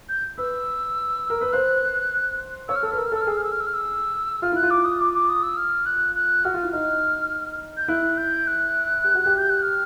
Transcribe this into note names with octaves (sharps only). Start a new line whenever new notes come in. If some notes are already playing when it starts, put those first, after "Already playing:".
G6
B4 E6
A#4
B4
C5 F#6
C#5 E6
F6
A4 E6
B4 F6
A#4 E6
F6
A4 E6
F6
G#4 E6
F6
E6
F6
E6
F6
E6
F4 F6
E4 F#6
F4
D6
D#6
D6
D6
D#6
E6
F6
F#6
F#6
F#4 F6
F4
E4
D#4 F6
G6
E4 F#6
G6
F#6
G4
F#4
G4
G6
F#6
F6